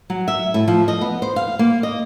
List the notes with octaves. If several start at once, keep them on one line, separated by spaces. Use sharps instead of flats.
F#3
E5
A2
F3
D#5
B3
C5
F5
A#3
D#5